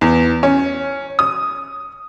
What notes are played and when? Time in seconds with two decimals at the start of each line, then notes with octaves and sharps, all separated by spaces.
0.01 E2
0.43 C#4
1.19 D#6